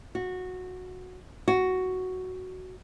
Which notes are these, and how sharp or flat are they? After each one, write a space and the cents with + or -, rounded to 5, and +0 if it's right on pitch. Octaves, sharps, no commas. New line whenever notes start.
F#4 -15
F#4 +5